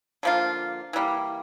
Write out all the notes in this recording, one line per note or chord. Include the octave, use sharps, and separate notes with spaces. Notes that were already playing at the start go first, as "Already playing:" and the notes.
D3 F3 A#3 F4
E3 G3 A#3